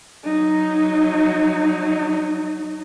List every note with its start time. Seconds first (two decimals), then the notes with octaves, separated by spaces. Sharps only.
0.25 F#3 D#4